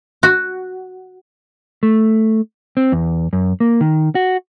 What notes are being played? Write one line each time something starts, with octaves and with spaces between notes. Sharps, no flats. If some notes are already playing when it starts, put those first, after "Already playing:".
F#4
A3
C4
E2
F#2
A#3
D#3
F#4